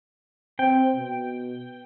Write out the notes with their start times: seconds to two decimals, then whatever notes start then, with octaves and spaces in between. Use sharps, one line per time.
0.59 C4 G5
0.96 B2